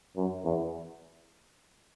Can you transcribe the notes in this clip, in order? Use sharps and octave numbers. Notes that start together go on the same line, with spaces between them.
F#2
E2